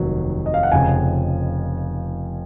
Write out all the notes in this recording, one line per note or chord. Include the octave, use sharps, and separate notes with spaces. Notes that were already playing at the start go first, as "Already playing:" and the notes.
Already playing: F1 D#2 D#3 F#3
D#5
F5
F#5
F1 F2 C#3 G#5